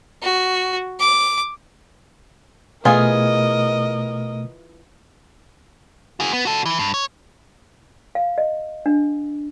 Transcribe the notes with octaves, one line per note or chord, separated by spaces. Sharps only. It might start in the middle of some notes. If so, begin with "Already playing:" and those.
F#4
D6
B2 E3 A3 F4 G#4 A#4 D#5 F6
F#4 G#4
B3
F#4 A4
E3
G2
C#5
F5
D#5
D4